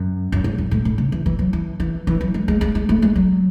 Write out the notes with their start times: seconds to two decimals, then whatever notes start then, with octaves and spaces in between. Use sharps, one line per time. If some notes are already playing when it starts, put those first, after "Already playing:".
Already playing: F#2
0.32 F#2
0.44 G#2
0.58 F#2
0.71 A2
0.85 A2
0.98 C#3
1.12 E3
1.26 E3
1.39 F#3
1.53 E3
1.80 E3
2.07 E3
2.21 F#3
2.34 G#3
2.48 G#3
2.61 G#3
2.75 G#3
2.89 A3
3.02 G#3
3.15 F#3